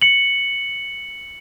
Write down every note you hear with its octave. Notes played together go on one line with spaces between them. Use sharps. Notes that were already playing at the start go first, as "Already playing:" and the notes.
C#7 F#7